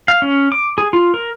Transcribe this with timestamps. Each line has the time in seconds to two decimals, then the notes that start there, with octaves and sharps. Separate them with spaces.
0.08 F5
0.22 C#4
0.52 D6
0.78 G#4
0.93 F4
1.14 A#4